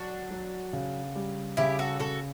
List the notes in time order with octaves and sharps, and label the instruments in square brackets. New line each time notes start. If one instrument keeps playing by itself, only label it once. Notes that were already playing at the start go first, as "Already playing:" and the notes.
Already playing: [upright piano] F#3 [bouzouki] D4 F#4
[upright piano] F#3
C#3
G3
[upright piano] C#3 [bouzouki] E4 G4
[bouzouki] F#4 A4
[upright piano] C#3 [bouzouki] F#4 A4